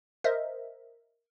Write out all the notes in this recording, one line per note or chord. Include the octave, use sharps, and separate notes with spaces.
A#4 C5 D#5 E5